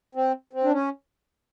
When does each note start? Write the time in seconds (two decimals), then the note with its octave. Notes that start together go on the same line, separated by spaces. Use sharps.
0.15 C4
0.53 C4
0.64 D4
0.72 C#4